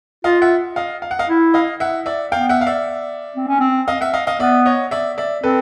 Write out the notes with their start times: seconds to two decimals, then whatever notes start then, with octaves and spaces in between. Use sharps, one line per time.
0.24 F4 D#5 F5
0.42 E5 F#5
0.76 D#5 F5
1.02 F5
1.11 F#5
1.19 D#5 F5
1.29 E4
1.54 D#5 F5
1.80 E5 F#5
2.06 D5 E5
2.32 B3 F5 G5
2.49 E5 F#5
2.61 F5
2.67 D5 E5
3.36 C4
3.48 C#4
3.59 C4
3.88 D#5 F5
4.01 E5 F#5
4.14 D#5 F5
4.27 D#5 F5
4.40 B3 D5 E5
4.66 C#5 D#5
4.91 D5 E5
5.18 D5 E5
5.44 C4 A4 B4